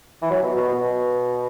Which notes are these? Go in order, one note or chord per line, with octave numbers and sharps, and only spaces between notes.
E3
F#3
B2
B2
B2